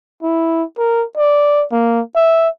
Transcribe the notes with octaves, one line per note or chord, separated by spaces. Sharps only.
E4
A#4
D5
A#3
E5